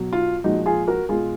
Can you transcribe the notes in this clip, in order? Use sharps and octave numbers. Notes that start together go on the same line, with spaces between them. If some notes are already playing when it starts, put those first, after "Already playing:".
Already playing: B2 F#3
F4
A#2 F3 G#3 D#4 F#4
F4 G#4
F#4 A#4
B2 G#3 F4 G#4